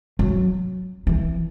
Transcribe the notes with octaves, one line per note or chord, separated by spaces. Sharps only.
F#3
E3